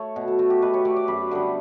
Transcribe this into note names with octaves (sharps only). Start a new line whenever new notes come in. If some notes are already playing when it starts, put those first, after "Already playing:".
Already playing: A3 C#5
B2
A4
A3 F#4
G4
B2 B4
C#5
A3 D5
D5
F#2 B5
D3 G3 B3